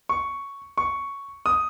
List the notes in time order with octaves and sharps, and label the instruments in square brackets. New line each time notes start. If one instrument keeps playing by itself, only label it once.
[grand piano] C#6
C#6
D#6